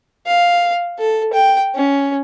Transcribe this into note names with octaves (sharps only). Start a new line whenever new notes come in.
F5
A4
G5
C#4